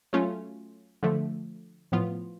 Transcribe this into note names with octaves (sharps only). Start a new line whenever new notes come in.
F#3 A3 C#4 F4
D3 F3 A3
A2 F3 B3 F4